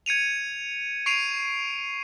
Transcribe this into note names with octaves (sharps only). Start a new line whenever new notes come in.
G#6 C#7 D#7 F7
C#6 C7 D7 D#7 F7